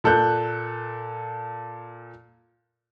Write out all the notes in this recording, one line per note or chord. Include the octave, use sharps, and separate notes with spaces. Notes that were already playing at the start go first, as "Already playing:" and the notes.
A#2 A4 F#6 G6